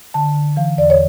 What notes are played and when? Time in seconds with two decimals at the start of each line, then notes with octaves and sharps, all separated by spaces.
0.14 D3 A5
0.35 D3
0.57 E3 F5
0.78 E2 D5
0.90 C#5